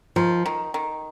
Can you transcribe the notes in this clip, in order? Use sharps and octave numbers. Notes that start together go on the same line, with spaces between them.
D#3 F3
D#3
D#3